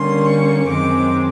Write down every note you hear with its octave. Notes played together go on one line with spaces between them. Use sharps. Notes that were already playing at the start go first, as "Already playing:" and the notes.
Already playing: D3 G3 A#3 C#4 C6
C#6
F#2 D#3 G#3 C4 D6